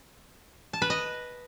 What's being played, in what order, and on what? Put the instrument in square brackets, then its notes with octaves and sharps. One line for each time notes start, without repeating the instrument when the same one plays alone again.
[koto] A5
B4
D#5